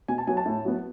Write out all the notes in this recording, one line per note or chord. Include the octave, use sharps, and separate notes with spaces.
B2 G#5
A5
F#3 B3 G#5
A5
A2
F#3 B3